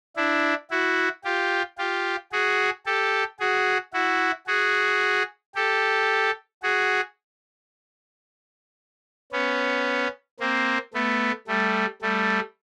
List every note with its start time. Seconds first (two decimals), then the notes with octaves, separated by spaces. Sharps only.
0.16 D4 E4
0.70 E4 F#4
1.24 F4 G4
1.78 F4 G4
2.32 F#4 G#4
2.86 G4 A4
3.40 F#4 G#4
3.93 E4 F#4
4.47 F#4 G#4
5.55 G4 A4
6.63 F#4 G#4
9.33 B3 C#4
10.40 A#3 C4
10.94 A3 B3
11.48 G3 A3
12.02 G3 A3